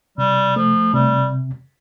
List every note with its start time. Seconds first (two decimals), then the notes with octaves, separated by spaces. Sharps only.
0.18 C3 G3
0.56 F3 A3
0.94 C3 G3